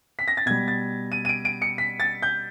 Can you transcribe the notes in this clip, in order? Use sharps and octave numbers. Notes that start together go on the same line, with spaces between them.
B6
A#6
A6
B2 G3 G#6
A6
D#7
D#7
D7
D7
C#7
B6
A6
G6